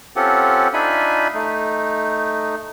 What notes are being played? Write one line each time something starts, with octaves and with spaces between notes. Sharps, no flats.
C4 C#4 F4 G4 A4 F#5
D4 D#4 F4 E5 G#5 B5
A3 D#4